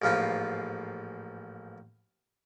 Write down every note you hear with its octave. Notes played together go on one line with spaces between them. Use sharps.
A1 G#2 F3 A#3 F4 B5